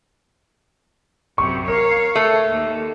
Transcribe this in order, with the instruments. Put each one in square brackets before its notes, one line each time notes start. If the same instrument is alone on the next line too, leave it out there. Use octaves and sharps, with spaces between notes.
[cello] F#2 C3 [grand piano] C#6
[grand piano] A#4 [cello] C#5 F5
[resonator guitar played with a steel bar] A3 [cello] C#5
[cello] D#2